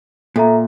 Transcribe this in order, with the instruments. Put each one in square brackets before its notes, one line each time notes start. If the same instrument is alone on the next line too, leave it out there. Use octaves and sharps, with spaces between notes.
[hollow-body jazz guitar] A#2 [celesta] A4 E5 A#5